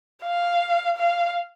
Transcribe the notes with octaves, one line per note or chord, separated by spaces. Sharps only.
F5
F5